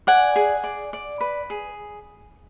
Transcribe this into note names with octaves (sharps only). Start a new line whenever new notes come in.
D5 F#5 G#5
G#4
D5
D5
B4
G#4